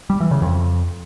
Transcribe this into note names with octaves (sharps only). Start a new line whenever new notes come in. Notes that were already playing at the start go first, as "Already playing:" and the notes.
G3
E3
C#3
F2